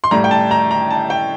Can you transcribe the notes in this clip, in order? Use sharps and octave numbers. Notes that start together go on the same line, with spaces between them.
C6
A2 G3 A#5
G5
A5
A#5
A#5
A5
G5